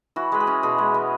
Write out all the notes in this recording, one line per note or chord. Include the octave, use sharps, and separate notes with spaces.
E3 F#4
G#3 B4
G#4
C#4
B2 G#4
G#3
B3